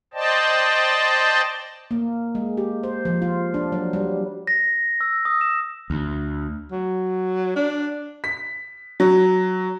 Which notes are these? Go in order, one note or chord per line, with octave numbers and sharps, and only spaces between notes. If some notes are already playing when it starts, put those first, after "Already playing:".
C5 D5 D#5 G5 A5
A#3
G#3
G4
C5
F3
F4
D4
F#3
G3
A#6
E6
D#6
E7
D2
F#3
D4
B6
F#3